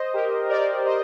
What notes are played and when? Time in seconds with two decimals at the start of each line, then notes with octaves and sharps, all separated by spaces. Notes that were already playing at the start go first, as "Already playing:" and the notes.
Already playing: C5 D#5
0.14 G4 A#4
0.49 A#4 D5
0.85 C5 D#5